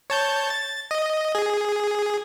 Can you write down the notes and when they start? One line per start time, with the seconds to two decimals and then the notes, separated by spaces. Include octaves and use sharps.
0.10 C#5 A5 G6
0.50 A6
0.91 D#5
1.35 G#4